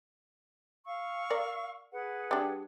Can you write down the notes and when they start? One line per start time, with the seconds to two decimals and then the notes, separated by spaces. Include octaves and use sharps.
0.86 F5 C#6 E6
1.30 A#4 D5
1.92 G#4 B4 F#5
2.31 G3 D4